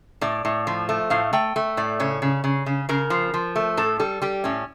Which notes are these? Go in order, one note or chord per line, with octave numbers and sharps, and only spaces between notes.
A2 D5
A2
F3
A3
A2 F5
A3 G5
A3
A2 D5
C#3 C#5
C#3
C#3
C#3
C#3 A#4
F3
F3
A3
A2 A4
G3 A4
G3 G4
A2 C#4